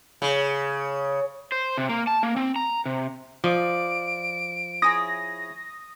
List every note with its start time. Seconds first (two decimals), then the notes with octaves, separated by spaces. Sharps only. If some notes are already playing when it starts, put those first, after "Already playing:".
0.22 C#3
1.52 C5
1.78 C3
1.89 A#3
2.07 A5
2.23 A#3
2.36 C4
2.56 A#5
2.86 C3
3.44 F3 D5 D#5 D7
4.82 E4 G#4 C#5 D#6 A#6